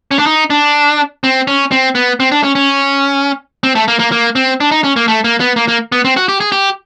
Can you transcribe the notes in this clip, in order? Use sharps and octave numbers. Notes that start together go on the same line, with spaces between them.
C#4
D4
D#4
D4
C4
C#4
C4
B3
C4
D4
C#4
C#4
C4
A3
A#3
A#3
A#3
C4
D4
D#4
C#4
A#3
A3
A#3
B3
A#3
A#3
B3
C4
F#4
G4
G#4
G4